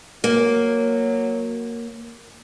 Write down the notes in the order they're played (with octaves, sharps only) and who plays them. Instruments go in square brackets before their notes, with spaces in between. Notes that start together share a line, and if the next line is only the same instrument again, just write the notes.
[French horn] F#3 [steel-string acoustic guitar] A#3